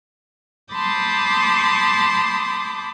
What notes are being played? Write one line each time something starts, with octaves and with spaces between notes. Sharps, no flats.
A5 B5 C6 D6 D#6 G6